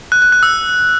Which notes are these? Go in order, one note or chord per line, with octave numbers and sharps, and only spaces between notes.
F#6
F#6
F#6
E6